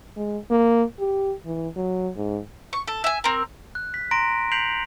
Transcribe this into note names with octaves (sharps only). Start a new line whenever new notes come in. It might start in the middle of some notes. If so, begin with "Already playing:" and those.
G#3
A#3
G4
E3
F#3
G#2
C#6
A4
E5 G#5
C4 A#4
F#6
B6
A#5 C6 A#6 D7
G6 B6 C7 D7 F7 F#7